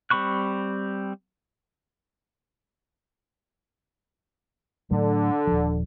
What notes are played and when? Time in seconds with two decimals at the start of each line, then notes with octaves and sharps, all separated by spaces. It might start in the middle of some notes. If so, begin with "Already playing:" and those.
0.10 G3 C4 B5 C#6 F#6
4.91 A2 D3 F#3 A3
5.47 D#1 F3